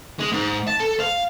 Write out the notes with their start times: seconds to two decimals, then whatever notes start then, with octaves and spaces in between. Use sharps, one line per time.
0.19 G#3
0.32 G#2
0.68 A5
0.80 A4
1.00 F5